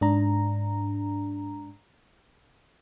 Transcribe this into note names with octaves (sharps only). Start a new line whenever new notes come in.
G#2 D4 A#5